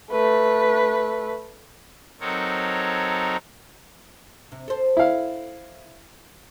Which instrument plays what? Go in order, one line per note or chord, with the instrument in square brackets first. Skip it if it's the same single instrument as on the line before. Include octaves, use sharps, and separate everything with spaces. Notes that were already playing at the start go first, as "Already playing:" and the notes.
[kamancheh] A3 B4
[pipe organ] F#3 C4 D#4 A4 A#4 C#5
[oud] C3
A4 C5
[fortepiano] E4 F5